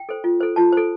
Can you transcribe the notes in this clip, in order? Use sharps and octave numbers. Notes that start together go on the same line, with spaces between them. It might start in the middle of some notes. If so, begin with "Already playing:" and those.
Already playing: G5
A4 C5
F4
A4 C5
F4 A5
A4 C5